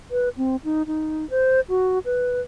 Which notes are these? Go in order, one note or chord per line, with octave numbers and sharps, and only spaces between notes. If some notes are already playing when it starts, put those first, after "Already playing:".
B4
C4
D#4
D#4
C5
F#4
B4